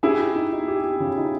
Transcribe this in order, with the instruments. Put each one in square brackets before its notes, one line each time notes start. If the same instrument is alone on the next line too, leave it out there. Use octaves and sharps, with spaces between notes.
[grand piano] E4 G#4 [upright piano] G4
[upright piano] G4
D#4
D#4
G4
G4
C#3
D#4